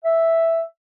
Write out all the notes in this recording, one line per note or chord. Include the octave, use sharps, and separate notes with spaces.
E5